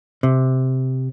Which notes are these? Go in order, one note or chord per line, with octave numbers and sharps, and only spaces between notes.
C3